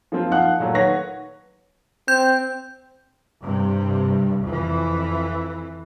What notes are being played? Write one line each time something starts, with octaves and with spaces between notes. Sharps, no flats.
F3 A#3 C4 F4
F3 D#4 F5 F#5 F#6
A#2 F#3 A3
D#3 B4 C#5 F#5 A#6
C4 G6
G2 C3
F2 E3